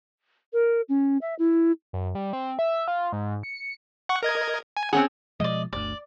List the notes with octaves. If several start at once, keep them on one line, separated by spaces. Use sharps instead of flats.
A#4
C#4
E5
E4
F#2
G3
C4
E5
F4
G#2
C#7
F#5 C#6
A#4 D#5 G#6
G#5
C4 C#4 G#4 F#5
B2 F3 G#3 D5 D#5
G1 D2 D5